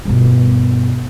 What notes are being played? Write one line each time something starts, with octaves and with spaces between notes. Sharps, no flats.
G2 B2